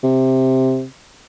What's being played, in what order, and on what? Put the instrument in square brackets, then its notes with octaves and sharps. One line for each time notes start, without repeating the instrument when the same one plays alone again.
[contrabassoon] C3